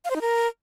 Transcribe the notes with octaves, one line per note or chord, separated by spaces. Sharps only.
F5
C5
D#4
A#4